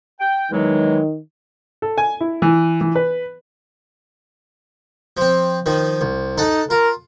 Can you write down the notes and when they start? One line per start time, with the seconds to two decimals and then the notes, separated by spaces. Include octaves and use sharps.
0.20 G5
0.51 E2 D#3 F#3 G#3
1.82 A4
1.98 G#5
2.21 E4
2.42 E3
2.81 E3
2.95 B4
5.17 F3 C4
5.66 D#3 F3
6.01 C2
6.38 D#4 A4 F#5 A5
6.70 F4 A#4